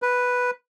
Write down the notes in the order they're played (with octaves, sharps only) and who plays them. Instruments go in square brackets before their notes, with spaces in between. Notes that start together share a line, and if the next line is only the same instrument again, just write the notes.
[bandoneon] B4